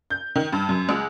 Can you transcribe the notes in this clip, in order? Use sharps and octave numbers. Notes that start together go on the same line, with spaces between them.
G6
D#3
G2
F#2
C#2